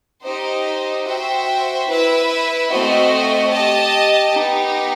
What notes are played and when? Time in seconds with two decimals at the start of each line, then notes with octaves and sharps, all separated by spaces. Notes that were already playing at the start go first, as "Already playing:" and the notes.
0.24 D#4 G4 C5 D#5
1.06 F#4 C5 E5 G5
1.88 E4 B4 E5
2.70 A3 C4 F#4 C5 D#5
3.51 G4 D#5 A5
4.33 B3 D#4 G4